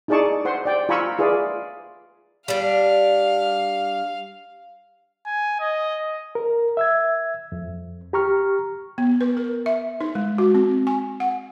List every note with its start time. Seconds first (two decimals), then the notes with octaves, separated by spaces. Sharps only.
0.08 D#4 E4 G#4 D5 A5 C#6
0.45 C5 F#5 C6
0.65 D5 G5
0.89 F4 G#5 A#5 B5 C#6 E6
1.19 F4 G#4 B4 D5 E5
2.48 G3 D4 F5
5.26 G#5
5.60 D#5
6.35 A#4
6.77 E5 E6 G#6
7.52 F2
8.13 G4 A#5 C#6 F6
8.98 B3
9.21 B4
9.37 A#4
9.66 E5
10.01 D#4
10.15 G#3
10.38 F#4
10.55 C4
10.87 G#5
11.20 F#5